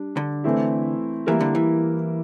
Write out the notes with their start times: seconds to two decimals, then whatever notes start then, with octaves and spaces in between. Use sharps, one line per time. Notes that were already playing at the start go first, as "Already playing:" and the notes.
Already playing: G3 D4
0.17 D3
0.44 E3 A3 C4 E4
1.27 E3 G3 A#3 E4 A#4
1.41 D3
1.55 E3